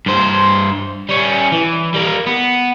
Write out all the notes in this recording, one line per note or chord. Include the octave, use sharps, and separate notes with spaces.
G2 C5
G3 C#4
E3
G3 A#3
B3